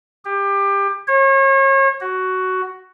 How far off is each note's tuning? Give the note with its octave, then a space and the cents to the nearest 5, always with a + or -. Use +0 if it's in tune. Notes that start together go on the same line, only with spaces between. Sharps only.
G4 +25
C#5 -35
F#4 +10